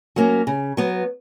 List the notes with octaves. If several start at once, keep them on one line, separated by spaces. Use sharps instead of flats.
F#3 A#3 C#4
C#3
F#3 B3